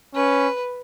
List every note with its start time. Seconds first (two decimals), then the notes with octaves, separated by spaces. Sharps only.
0.15 C#4 B4